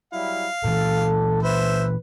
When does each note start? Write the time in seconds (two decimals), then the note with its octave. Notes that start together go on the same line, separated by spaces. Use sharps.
0.13 F#3 G3 E4 F5
0.64 A#2 E3 A4
1.43 B4 C5 E5